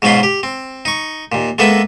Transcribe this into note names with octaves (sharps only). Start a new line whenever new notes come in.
G#2 B2 F#3 F4 B5 C6
G4
C4
D#4 C#6
D#2 A#2
G#3 A#3 B3 A4 B4 E5